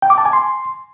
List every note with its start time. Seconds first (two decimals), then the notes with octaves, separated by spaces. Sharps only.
0.02 G5
0.10 D6
0.18 A5
0.25 G#5
0.33 C6